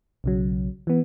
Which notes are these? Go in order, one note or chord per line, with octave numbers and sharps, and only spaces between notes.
B1 C#3 F#3
E3 B3